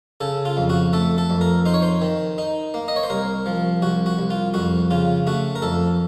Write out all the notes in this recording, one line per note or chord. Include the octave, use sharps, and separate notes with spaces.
C#3 A4
F4
F2
F#4
A3 A4
A4
F2
A#4
D#4 C5
C#5
C5
D#3
D#4
A#3
D#5
C#5
C5
C2 A#4
F3
C2 F#4
F#4
C2
F4
F2 F#4
C#3 F4
A3 F#4
A#4
F2 A4